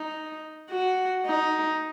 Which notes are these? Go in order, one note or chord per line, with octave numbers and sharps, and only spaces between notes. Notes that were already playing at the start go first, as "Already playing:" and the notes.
Already playing: D#4
F#4
D#4